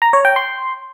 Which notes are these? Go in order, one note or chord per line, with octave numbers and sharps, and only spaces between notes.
A#5
C#5
G5
C6